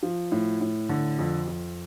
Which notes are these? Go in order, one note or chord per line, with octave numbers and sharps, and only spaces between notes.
F3
A2
A2
D3
F2
F2